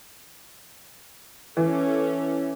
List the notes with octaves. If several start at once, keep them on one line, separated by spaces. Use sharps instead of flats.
E3 C#4 A4